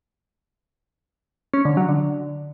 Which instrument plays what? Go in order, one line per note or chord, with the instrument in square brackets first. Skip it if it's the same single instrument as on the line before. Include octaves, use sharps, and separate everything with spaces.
[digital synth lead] C#4
D3
F#3
D3